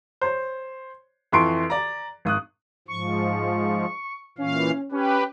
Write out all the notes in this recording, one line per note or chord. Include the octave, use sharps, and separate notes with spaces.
C5 C#5
F2 E3 C6 C#6 D7
D5 A#5
G#1 D#6 F#6
G#2 F3 C#6
A#2 E3 C#4 F5
C#4 G4 B4